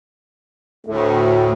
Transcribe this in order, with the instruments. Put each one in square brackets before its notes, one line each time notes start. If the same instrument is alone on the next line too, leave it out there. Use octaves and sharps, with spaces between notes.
[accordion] D2 A2 [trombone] A3